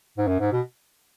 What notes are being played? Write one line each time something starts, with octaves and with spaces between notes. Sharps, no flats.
G#2
F#2
G#2
B2